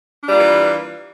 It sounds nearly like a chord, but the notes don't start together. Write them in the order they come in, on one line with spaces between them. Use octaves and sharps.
D4 G3 F4 A#3 E3